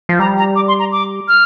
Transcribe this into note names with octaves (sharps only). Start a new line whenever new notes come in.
F3
G3 A#5
A#5
D6
C6
A#5
D6
F6